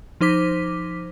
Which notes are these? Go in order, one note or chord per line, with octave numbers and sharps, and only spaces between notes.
F3 D#4 C5 D6 B6